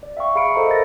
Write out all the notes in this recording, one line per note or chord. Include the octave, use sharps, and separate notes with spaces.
D5
E5 F5 G5 C#6
G#4 F5 B5 C#7 D7
A4 C5 D#5 E5 A#5
A#4 A6 A#6